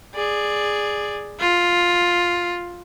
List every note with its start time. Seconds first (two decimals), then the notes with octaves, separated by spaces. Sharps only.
0.15 G#4 D5
1.40 F4